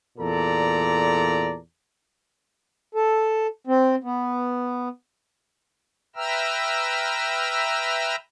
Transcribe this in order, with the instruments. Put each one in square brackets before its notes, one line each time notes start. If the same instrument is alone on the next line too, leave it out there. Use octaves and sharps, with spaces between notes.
[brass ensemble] E2 A#2 A4 D5 A#5
[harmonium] A4
C4
B3
[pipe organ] B4 E5 G5 A#5 E6 F6